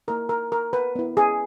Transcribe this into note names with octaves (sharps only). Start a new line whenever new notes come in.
A#3 E4 A#4
A#4
A#4
B4
B3 E4
G#4